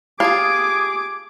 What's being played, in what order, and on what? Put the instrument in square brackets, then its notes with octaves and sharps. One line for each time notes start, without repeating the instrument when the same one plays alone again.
[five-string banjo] F4 [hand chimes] G4 A5 D#6 [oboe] G#4 [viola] D6